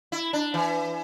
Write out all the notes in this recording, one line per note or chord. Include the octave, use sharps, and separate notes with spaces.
E4
D4
E3